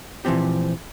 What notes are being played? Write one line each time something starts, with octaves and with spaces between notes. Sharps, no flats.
A#2 E3 F3 C4 G4